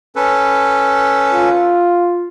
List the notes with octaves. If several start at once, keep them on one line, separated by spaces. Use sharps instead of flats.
C#4 A4 B4
F4